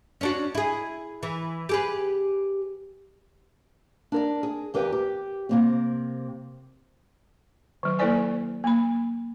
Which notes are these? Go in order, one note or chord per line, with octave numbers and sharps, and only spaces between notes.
C#4 D4 F#4
E4 G#4
E3
G4 G#4 B4
D4 A#4 D5
G#4
E2 G4 A#4 B4 F5 G5
G4
C3 A#3 C4
D#3 F#3
A#3 E4 A4 C5 D5 G#5
A#3 B5